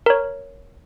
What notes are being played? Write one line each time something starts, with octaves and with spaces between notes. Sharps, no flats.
A#4 C#5